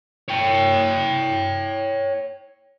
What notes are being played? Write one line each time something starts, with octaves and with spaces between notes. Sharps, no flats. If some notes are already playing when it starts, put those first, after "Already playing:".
C#5 G5